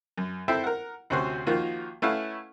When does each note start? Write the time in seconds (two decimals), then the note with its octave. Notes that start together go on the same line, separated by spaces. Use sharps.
0.18 F#2
0.48 C4 E4 A4 C5 E5 G5
0.64 A#4 F#5
1.10 D2 C3 C#4 F#4 C5 C6
1.47 D#3 F3 A#3 F4 F#4
2.02 A3 C#4 E4 B4 F5 F#5